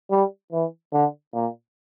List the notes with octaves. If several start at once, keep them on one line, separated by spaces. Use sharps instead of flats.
G3
E3
D3
A#2